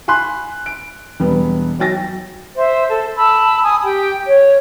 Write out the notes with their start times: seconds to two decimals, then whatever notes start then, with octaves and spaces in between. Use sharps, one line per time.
0.08 G#5 B5 C6 F#6
0.66 D7
1.20 E1 G3 B3
1.79 F#3 G5 A6 A#6
2.56 C5 E5
2.90 A4
3.16 A5 B5 E6
3.62 G#5 D#6
3.83 G4 G5
4.26 C#5